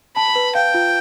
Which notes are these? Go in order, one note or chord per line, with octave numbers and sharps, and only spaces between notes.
A5 B5
B4
F5 G5
F4